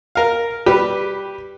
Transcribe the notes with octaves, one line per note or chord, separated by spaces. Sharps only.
A#4 F5
G3 G4 B4